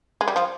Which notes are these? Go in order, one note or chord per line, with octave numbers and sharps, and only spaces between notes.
G#3
G3
F3